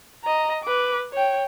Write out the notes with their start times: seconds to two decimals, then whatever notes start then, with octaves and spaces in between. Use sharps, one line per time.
0.24 D#5 A#5
0.63 B4 D6
1.13 C#5 G5